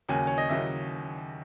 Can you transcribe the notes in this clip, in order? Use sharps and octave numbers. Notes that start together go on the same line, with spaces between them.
D#2 C#3 F#3 G#5
C#5
D#5
D#2 C#3 F#3 E5